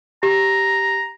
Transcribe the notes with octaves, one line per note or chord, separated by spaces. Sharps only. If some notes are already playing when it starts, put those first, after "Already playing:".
G4 A#5